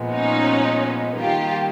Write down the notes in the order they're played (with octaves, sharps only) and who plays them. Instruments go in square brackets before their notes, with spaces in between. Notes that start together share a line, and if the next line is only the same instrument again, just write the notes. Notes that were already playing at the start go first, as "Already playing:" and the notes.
Already playing: [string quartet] A#2 F3 G#3 B3
[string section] C#4 D#4
[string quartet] D#3 G3 A#3 D#4 [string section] F4 G4